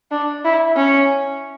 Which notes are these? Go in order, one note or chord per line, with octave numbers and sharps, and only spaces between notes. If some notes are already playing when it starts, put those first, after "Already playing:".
D4
E4
C#4